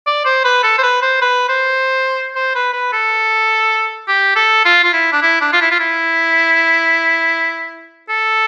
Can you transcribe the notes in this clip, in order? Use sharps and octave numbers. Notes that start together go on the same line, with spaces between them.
D5
C5
B4
A4
C5
B4
C5
B4
C5
C5
B4
B4
A4
G4
A4
F4
F4
E4
D4
E4
D4
F4
E4
F4
E4
A4